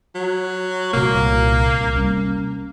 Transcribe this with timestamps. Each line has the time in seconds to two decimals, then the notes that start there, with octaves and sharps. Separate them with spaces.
0.15 F#3
0.93 C2 A#2 A#3
1.79 C2
1.95 G3 C#4